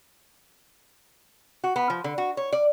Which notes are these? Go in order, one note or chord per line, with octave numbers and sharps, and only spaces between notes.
F#4
B3
F3
D3
F#4
C#5
D5